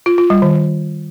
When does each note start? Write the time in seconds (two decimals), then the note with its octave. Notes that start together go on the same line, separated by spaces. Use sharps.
0.06 F4
0.18 F4
0.30 G3
0.42 D#3